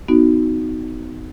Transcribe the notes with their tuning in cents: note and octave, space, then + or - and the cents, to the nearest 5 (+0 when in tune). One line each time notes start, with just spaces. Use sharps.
B3 +35 D#4 +0 F#4 +0